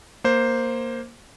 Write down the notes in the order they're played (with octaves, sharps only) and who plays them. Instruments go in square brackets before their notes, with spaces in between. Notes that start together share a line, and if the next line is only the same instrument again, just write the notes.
[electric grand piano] A#3 C5